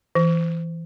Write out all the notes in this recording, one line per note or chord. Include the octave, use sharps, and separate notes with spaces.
E3